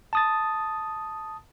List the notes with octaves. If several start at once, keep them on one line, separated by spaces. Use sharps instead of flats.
A5 D#6 A6